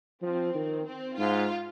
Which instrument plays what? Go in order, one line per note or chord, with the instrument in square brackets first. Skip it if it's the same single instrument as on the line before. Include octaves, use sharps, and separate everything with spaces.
[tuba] F3 [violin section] C4
[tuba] D#3
[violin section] C4
[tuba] G#2 [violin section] F4